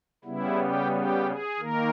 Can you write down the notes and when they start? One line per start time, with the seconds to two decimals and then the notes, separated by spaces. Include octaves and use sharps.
0.24 C#3 G3 B3 E4
0.58 G4
0.92 G4
1.25 G#4
1.59 D#3 A#3 A#4